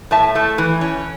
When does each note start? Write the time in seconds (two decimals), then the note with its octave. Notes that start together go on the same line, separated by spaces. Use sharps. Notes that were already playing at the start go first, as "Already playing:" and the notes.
0.11 A2 E5 A5
0.35 A3
0.58 E3
0.81 C#4